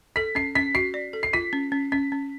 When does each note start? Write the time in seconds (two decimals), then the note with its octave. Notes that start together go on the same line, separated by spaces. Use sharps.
0.16 A4 B6
0.35 C#4 C7
0.55 C#4 B6
0.75 F#4 C7
0.94 D5
1.13 A4
1.23 C7
1.33 F4 B6
1.53 C#4
1.72 C#4
1.92 C#4 B6
2.12 C#4